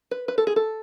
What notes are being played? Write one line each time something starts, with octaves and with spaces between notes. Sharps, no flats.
B4
B4
A4
G#4
A4